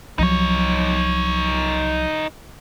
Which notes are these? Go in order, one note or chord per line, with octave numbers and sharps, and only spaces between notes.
C2 F3 F#3 D#4 C#5